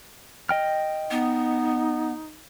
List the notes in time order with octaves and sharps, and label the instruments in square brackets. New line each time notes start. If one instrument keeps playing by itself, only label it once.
[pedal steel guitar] D#5 G5 F6
[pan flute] B3 [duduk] D#4